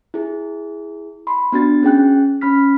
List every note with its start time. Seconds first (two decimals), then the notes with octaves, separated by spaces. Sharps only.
0.14 E4 G#4
1.27 B5 C6
1.52 B3 D4 F#4 A6
1.83 C#4 G#4 G5 F#6
2.41 C#4 B5 F6 B6